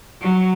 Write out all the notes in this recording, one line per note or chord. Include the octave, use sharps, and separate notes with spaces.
F#3